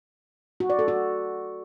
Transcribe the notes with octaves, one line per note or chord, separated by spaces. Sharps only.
F#4
D5
A4
F#4